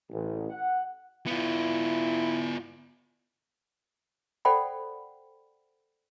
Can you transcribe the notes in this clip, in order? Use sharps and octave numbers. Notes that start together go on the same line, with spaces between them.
A1
F#5
B3 E4 F4
A4 C5 D5 F#5 G5 B5